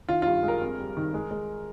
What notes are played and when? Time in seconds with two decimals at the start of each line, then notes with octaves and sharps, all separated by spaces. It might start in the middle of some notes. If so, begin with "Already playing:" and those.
0.09 D#3 F4
0.22 G2 F4
0.43 G#3
0.48 A#4
0.62 F2
0.78 G3
0.97 D#3
1.14 G#3
1.31 G#3